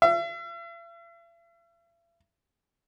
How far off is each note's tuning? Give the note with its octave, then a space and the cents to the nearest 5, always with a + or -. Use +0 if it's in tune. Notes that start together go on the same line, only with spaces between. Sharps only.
E5 +45